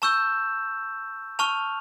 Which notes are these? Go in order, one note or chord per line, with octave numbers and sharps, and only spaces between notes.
A5 C#6 E6 G6 E7
A5 C#6 F6 F7